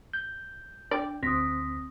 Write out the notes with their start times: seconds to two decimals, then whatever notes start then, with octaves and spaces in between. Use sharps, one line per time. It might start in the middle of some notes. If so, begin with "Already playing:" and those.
0.13 G6
0.91 D4 D5 G5
1.23 D2 C4 D#6 A#6 B6